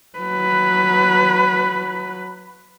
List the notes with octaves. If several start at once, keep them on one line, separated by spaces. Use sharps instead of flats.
F#3 B4